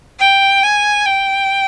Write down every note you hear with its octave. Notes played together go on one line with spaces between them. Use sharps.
G5
G#5
G5